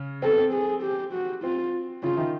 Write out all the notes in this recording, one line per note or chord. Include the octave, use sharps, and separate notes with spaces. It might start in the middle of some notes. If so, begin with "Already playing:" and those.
Already playing: C#3 C#4
C4 A4
B3
C4
G#4
G4
F#4
C4 F4
C#3 C#4 F4
E4
D#3 D#4